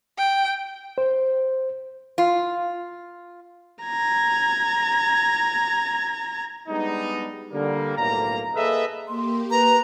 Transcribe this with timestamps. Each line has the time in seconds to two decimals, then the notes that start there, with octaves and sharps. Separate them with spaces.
0.18 G5
0.98 C5
2.18 F4
3.84 A#5 G#6
6.68 G3 G#3 B3 D4 D#4
7.52 D3 G3 A#3
7.97 B1 A2 A#3 A#5
8.55 A#3 G#4 A4 B4 D#5 E5
9.08 A#3 G4 C6
9.51 B4 A#5